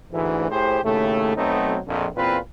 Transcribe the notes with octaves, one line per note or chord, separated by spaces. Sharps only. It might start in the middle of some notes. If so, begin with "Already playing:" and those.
D2 G#2 E3
A2 G4 G#4 C5
D#2 A2 C#3 A3
B1 F#3 A3 B3 C4 D#4
A#1 F2
E2 A#2 C4 F4 B4